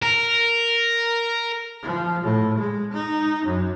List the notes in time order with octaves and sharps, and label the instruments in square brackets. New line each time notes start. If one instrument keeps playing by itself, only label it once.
[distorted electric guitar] A#4
[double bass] F3
A2
G#3
D#4
F#2